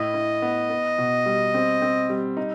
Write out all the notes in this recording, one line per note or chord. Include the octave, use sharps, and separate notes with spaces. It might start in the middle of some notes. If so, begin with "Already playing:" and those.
Already playing: A2 E4 D#5
E4
B3
B3
B2
G3
C4
C4
G3
D#4